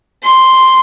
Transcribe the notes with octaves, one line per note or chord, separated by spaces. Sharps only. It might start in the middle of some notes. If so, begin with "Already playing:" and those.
C6